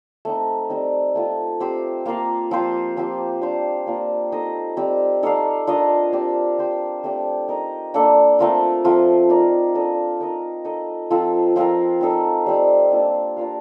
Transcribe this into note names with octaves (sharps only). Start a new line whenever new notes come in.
A3 C4 D#4
G3 C4 D#4
A3 C4 F4
C4 G4 C5
A#3 F4 A#4 F5
F3 C4 F4 C5
F3 C4 G4
D4 G4 C5 F5
A#3 D4 F4 A#4
C4 D#4 A4 D#5
G3 C4 G4
D#4 A4 D5 F5
D4 F4 A#4 D#5
C4 G4 D5
C4 G4 C5
A3 C4 G4 D5
D#4 A#4 D#5
A#3 D4 A4 D5
A3 C4 F4 A#4
F3 A3 C4 F4
D#4 A#4 D5
D4 A4 D#5
D#4 A#4 D#5
D#4 A4 D#5
F3 C4 F4 A4
F3 C4 F4 A#4
C4 D#4 A4
G3 C4 G4
A#3 D4 F4
D4 F4 A#4 F5